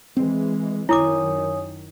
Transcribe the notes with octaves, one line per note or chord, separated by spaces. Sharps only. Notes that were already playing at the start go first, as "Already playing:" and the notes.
E3 G#3 C4
F#2 D#3 E4 C#5 G#5 D6 D#6